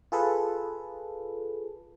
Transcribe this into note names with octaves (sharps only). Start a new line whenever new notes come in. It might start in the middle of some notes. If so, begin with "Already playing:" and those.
F4 G#4 A4 B4